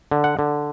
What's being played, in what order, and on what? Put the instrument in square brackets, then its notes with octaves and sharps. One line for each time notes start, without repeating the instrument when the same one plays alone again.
[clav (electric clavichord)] D3
F#5
D3